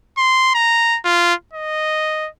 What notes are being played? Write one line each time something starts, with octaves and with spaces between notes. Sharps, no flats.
C6
A#5
F4
D#5